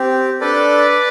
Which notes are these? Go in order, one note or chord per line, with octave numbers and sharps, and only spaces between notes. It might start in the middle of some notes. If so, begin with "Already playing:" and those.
Already playing: C4 G4
D4 A4 B4 D5